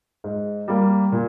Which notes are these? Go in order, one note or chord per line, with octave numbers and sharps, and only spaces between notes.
G#2
G3 A#3
A#2